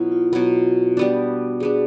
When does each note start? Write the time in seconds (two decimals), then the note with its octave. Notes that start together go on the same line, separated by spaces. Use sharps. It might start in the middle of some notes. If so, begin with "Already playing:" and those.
Already playing: B2 F#3 B3 E4 F4
0.12 F4
0.33 B2 F#3 B3 F#4
0.97 G3 B3 D4
1.60 G3 B3 D4 G#4